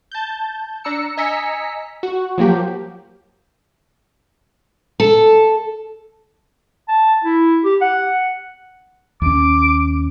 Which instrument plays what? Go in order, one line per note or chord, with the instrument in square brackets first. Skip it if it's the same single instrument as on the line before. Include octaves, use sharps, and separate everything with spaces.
[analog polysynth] A5 G6
D4 A#5 E6 C#7
D#5 G#5 A#5 E6 B6 C#7
F#4
F3 F#3 A#3 G4
[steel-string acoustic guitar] A4
[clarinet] A5
E4
G4
F#5
[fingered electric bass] D#2 C#4 [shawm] D6